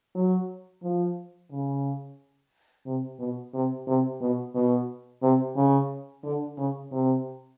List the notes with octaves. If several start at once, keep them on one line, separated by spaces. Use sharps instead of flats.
F#3
F3
C#3
C3
B2
C3
C3
B2
B2
C3
C#3
D3
C#3
C3